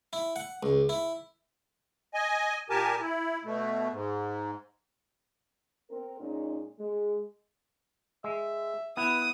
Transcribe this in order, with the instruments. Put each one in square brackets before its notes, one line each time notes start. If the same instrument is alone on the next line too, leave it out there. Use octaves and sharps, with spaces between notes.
[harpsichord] E4
F#5
C#2
E4
[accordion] D#5 G#5
A#2 G4 A#4 G#5 A5
E4
B2 A3
G#2
[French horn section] C4 A#4
A#2 G#3 C#4 D#4
G#3
[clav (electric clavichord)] G#3 [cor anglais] E5
[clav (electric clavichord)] B3 E4 [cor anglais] B4 [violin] D#6